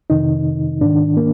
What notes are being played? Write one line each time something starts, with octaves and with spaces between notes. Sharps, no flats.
F2 C3 D#3 D#4
G#2 D#3 D4
A#3